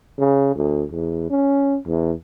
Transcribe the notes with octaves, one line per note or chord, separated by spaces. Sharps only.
C#3
D2
E2
C#4
E2